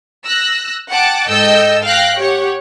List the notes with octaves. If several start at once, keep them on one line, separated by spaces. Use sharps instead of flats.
E6 F#6 A#6
F#5 G5 A5 D6 F#6
G#2 A4 D#5 G5 E6 G6
F5 G5 F#6 A#6
G4 C#5 F#5